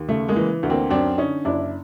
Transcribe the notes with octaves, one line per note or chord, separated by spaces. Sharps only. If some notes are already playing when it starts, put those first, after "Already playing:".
Already playing: D#2
C#3 A3
G#3 A#3
E3
D2
A#3 C4
F#2 C4 D4
D3 C#4 D#4
F#1 D4 E4